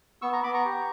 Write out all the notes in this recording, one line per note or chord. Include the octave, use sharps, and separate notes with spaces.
B3 C#6 E6
A#5 C#6
B3 B5 D6
A#5 C#6
G4